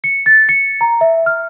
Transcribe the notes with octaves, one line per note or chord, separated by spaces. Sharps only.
C#7
A6
C#7
A#5
E5
F6